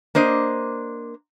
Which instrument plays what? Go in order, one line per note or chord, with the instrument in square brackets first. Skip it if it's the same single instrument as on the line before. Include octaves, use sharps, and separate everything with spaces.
[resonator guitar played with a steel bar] A#3 D4 C5 D#5